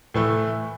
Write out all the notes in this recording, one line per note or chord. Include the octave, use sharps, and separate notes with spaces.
A2 E3 A3 E4